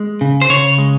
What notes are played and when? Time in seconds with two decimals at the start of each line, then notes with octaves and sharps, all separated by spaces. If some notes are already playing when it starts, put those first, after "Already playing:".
Already playing: G#3
0.21 C#3
0.42 C5
0.50 C#3 C#5
0.78 G#3